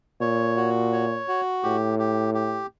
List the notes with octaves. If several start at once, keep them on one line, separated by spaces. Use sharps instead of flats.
A#2 C#5
F#4
C#5
F#4
A2 G4
G4
G4